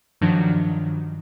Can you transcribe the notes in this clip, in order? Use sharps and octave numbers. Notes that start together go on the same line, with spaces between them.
G2 D#3 F3 F#3 D4